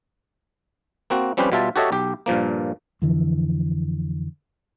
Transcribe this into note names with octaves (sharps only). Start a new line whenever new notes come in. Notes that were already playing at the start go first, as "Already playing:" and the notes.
A#3 C4 F#4
F3 G3 C4 C#4 G4 B4
B2 G3 F4 E5 A5
F#4 G4 A4 C#5 D#5 E5
B1 G4
G2 A#2 F3 A#3
F2 D3 E3